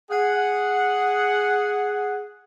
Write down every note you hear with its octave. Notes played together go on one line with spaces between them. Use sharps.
G#4 F#5